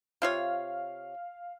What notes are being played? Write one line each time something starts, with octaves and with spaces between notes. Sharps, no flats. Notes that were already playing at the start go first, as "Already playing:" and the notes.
C3 F4 C#5 F5